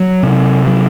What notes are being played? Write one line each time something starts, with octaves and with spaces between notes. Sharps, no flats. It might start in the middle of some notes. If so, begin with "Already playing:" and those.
Already playing: F#3
C3
F#3